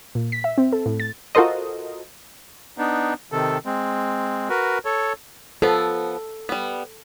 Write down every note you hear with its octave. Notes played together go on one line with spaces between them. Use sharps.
A#2
B6
E5
C4
A4
A2
A6
F4 F#4 A4 A#4 C5 D#5
B3 D4 D#4
C3 D#3 A4
G#3 C4
F#4 A#4 B4
A4 C#5
F3 B3 A4
G3 B3